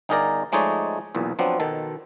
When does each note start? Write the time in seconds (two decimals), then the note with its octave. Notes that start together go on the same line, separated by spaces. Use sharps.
0.09 G1 D#4 G#4 A#4 D5 A#5
0.52 F3 G#3 A3 D#4 C#5 D5
1.15 B1 E2 A#2
1.39 F3 F#3 B3 C4 D4
1.60 B2 D#3 A4